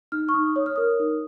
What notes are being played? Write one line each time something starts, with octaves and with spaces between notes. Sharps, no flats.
D#4 F6
C#6
D#4 D#6
C#5 D#6
F6
A#4 D#6
D#4